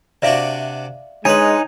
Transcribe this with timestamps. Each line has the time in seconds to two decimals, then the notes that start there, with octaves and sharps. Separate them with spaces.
0.22 C3 D4 F#4 D5 E5 F5
1.25 G#3 D4 D#4 B4 C#5 G#5